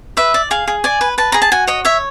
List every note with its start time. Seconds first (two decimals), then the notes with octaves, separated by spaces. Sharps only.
0.17 B4 E5
0.34 D5
0.51 G#4 F5
0.67 G#4
0.84 D5 G#5
1.01 B4
1.18 B4 A5
1.32 G#4 A#5
1.42 A5
1.52 F#4 G#5
1.67 C#5 D#5
1.85 C#5 E5